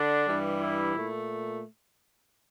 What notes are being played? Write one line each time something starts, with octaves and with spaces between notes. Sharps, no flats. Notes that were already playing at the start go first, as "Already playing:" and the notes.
Already playing: D3 D4
G2 E3 G3
E4
A#2 A3